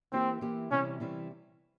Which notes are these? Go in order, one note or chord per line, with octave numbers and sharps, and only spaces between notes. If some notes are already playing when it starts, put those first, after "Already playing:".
E3 A#3 C4 E4 G4
E3 A#3 E4 G4
C3 E3 G3 C4 C#4 E4
C3 E3 G3 C4 E4